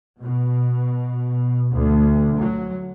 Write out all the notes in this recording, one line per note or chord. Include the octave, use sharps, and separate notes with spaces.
B2
D2
F#3